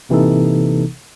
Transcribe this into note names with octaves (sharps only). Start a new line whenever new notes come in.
A1 C3 E3 A#3 D#4 A4